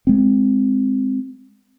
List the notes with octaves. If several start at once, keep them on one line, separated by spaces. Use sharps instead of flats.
G#3 C4